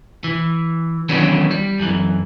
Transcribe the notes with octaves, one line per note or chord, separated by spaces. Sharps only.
E3
D#3 E3 F#3 B3 C#4 D4
G3
F#2 E3